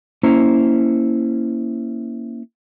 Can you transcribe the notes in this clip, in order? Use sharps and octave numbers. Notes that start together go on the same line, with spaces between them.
A#3 C#4 E4 C5 A#5